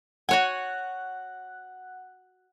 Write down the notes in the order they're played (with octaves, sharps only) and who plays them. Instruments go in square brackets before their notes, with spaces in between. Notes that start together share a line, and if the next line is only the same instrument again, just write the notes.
[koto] F#4 C#5 G#5 [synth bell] F#5 F#6